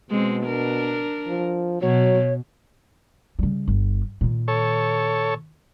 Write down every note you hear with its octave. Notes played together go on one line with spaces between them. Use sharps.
B2 G#3 C4
D4 A#4
F3
B2 F#3 C#5
C#3 G3
G1
A#2 D#3
A4 C#5